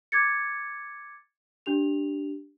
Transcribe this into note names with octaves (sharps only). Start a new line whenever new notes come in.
D6 G#6 A6 C#7
D4 G4 F7